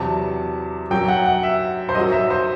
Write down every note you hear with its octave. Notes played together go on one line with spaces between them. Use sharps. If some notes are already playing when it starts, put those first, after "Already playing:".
Already playing: E2 C3 F#3 A5
F#2 F#3 G5
F#5
F#5
E5
C5
F#2 F#3 D#5
E5
C5